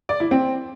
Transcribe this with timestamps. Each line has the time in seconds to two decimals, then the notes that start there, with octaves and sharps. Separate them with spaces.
0.09 D5
0.20 E4
0.31 C4